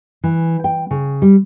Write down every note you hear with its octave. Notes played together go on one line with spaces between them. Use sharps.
E3
G5
C#3
G3